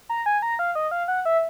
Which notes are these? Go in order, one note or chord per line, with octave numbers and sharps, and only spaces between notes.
A#5
G#5
A#5
F5
D#5
F5
F#5
E5